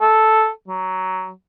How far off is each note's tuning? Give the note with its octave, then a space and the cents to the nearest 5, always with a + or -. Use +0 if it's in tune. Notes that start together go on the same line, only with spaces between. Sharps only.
A4 -5
F#3 +15